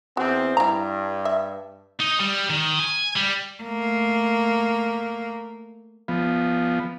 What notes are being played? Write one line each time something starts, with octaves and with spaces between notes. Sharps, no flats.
E2 C4 F#4
G2 E4 A#5
E5
D#4
G3
D#3
G#5
G3
A3 A#3
F3 B3